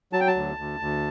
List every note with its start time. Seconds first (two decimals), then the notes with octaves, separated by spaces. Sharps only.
0.13 F#3 A5
0.20 G5
0.27 A5
0.35 D2
0.57 D2
0.80 D2